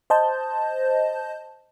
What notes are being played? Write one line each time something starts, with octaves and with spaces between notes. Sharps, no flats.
C5 D#5 A5 G6